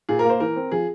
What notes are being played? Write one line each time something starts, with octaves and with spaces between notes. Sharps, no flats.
A#2 G#4
A#4
A#3
C5
E3 A#4
C4
F3 G#4